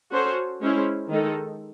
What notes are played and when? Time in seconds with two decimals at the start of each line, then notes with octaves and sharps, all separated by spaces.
0.12 C#4 F#4 A4 C5
0.61 G#3 C#4 E4 C5
1.09 D#3 G#3 D#4 A4